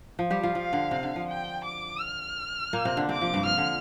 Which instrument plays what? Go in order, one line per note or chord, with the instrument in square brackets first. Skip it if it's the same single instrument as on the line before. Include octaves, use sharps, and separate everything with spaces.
[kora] F3
G3 G4
F3 F4
[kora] F3 [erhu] F5
[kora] D3
C3
D3
F3
[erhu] G5
D6
F6
[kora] A#2 A#3
C3 C4
D3 D4
[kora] C3 C4 [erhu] D6
[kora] F3
G2 G3
[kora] F3 [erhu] F6
[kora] D3